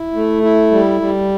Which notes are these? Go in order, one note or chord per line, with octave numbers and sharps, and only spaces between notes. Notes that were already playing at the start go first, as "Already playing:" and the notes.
Already playing: E4
A3
E4
G3
G3